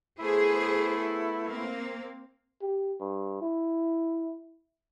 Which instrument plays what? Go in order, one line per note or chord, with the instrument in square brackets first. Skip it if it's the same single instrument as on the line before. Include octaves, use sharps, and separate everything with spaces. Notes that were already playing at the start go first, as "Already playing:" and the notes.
[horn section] A3 B3 E4 [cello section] G#4 C5
[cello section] A#3 C4
[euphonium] G4
G2
E4